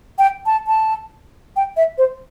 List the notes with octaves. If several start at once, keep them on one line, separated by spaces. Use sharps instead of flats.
G5
A5
A5
G5
E5
C5